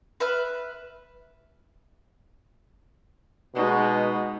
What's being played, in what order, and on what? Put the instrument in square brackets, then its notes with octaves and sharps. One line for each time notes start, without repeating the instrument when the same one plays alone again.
[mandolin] B4 E5 F6
[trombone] B2 [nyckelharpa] G#3 D#4